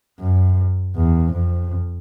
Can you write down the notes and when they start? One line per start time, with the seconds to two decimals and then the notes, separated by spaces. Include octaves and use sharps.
0.19 F#2
0.96 E2
1.33 F2